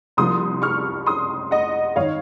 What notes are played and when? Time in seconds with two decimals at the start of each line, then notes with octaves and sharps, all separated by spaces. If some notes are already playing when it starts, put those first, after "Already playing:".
0.17 C2 C3 F3 A#3 C6 D#6
0.62 C#6 F6
1.06 C6 D#6
1.51 D#5 F#5
1.96 G#1 D#3 C#5 F5